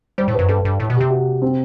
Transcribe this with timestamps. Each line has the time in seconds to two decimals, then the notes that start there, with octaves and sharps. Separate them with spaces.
0.18 G3 C5
0.28 A2
0.34 F#2 B4
0.49 G2 A4
0.65 G2
0.80 A2
0.90 B2
0.96 C3 G4
1.11 F#4
1.42 C4